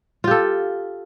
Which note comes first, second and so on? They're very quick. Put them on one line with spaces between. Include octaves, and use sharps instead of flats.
F4 G4 A4